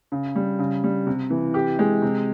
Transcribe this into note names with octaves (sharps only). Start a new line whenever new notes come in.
C#3
G3
C#3
G3
C3
E3
G4
G#3
C3